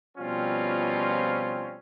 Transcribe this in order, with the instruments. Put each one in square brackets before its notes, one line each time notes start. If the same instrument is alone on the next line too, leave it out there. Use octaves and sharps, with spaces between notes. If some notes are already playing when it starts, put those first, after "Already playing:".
[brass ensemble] B2 F3 G3 C4 C#4 F4